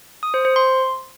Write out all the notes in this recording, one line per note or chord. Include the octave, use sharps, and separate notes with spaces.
D#6
C5
C5
C6